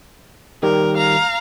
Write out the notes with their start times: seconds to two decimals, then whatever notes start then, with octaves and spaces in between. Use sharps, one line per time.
0.63 D#3 G3 G4 A#4
0.97 F5 A#5